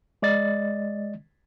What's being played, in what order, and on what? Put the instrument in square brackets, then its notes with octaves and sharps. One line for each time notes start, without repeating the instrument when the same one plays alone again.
[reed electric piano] G#3 D5 D#5 A6